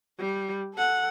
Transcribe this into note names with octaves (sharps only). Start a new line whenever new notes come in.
G3
A4 F#5